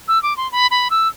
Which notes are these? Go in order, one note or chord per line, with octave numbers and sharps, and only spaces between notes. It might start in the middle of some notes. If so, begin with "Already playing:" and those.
E6
D6
C6
B5
B5
E6